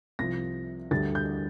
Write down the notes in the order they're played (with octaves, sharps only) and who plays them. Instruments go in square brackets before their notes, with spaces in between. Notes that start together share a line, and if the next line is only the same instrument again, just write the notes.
[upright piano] C2 C3 F3 A#6
D2 D3 G3 A6
G6